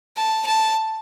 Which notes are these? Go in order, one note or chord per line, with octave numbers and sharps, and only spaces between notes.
A5
A5